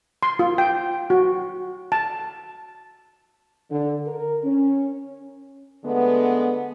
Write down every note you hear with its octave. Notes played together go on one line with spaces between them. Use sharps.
C6
F4
G5
F#4
A5
D3
A#4
C#4
D3 G#3 A3 B3